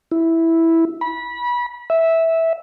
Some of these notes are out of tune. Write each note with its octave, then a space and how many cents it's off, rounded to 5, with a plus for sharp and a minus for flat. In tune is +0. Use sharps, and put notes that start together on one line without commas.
E4 -5
B5 -25
E5 -10